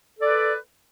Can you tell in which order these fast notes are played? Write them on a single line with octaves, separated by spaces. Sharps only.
A4 D5 B4